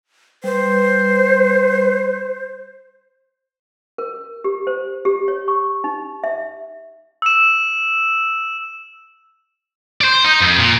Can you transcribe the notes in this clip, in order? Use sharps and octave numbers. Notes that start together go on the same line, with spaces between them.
G3 B4 C5
A#4
G4
C5
G4
C#5
C#6
D#4
E5
E6 E7
C5 D5
D#4
F2
A#2